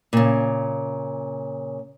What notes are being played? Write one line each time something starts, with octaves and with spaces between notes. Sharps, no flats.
A#2 C#3